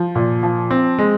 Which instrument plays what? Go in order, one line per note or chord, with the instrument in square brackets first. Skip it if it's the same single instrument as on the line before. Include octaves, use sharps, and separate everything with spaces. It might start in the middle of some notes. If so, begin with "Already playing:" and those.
Already playing: [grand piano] F3
A#2
F3
C4
G#3